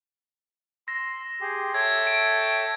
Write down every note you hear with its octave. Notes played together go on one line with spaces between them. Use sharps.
C6 E6 A#6
G4 G#4 C6
A4 C#5 E5 G5 G#6
D7